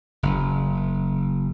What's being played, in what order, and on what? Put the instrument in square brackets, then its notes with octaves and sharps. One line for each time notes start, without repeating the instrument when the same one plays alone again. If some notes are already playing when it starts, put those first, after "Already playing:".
[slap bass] F#1